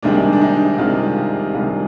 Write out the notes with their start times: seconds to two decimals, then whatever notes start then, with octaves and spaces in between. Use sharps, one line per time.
0.02 C2 C3 D#3 G#3 D4
0.33 D4
0.41 D#4
0.78 C2 C3 D#3 G#3 F4
1.55 C2 C3 D#3 G#3 F4